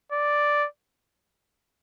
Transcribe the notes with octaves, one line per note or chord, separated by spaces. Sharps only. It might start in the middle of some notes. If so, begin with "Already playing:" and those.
D5